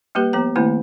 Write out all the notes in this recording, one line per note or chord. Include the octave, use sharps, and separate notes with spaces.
G3 A#3 G4 B4
F3 B3 A#5
D#3 A3 A#3 C4 E4